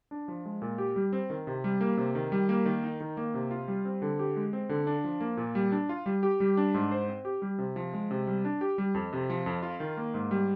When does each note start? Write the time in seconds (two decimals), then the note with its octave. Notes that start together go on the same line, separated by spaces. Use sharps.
0.11 D4
0.28 F3
0.45 G#3
0.62 A#2
0.78 G4
0.96 G3
1.13 C4
1.30 D#3
1.47 C3
1.64 G3
1.81 A#3
1.97 C3
2.15 D#3
2.32 G3
2.49 A#3
2.66 D#3
2.83 D#4
3.00 D#3
3.17 A#3
3.34 C3
3.51 F4
3.68 G3
3.85 C4
4.02 D3
4.19 G4
4.36 G#3
4.53 C4
4.69 D3
4.87 D4
5.04 F3
5.20 A#3
5.37 A#2
5.55 G3
5.72 D4
5.89 F4
6.06 G3
6.23 G4
6.40 G3
6.57 D4
6.74 G#2
6.91 C5
7.08 C4
7.25 G4
7.42 G3
7.58 C3
7.76 F3
7.93 G#3
8.11 C3
8.27 G3
8.45 D4
8.61 G4
8.78 G3
8.94 F2
9.13 C3
9.30 F3
9.46 F2
9.62 F4
9.80 D#3
9.97 A#3
10.14 G#2
10.31 G3